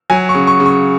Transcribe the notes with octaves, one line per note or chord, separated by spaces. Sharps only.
F#3 G#5
C#6
C#3
C#6
C#3
C#6